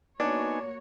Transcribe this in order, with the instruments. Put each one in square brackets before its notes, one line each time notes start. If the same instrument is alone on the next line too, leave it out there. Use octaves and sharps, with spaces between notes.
[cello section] A#3 F#4 C#5 [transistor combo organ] B3 D#4 G#5 [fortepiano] D4